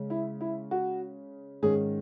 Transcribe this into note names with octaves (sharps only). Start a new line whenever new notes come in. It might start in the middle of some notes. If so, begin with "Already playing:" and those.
Already playing: C#3 G#3 C#4
E4
E4
F#4
G#2 D#3 G#3 C#4 G#4